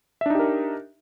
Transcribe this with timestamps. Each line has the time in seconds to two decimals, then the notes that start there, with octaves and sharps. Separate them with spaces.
0.21 E5
0.26 D4
0.30 D#4
0.35 G4
0.39 A#4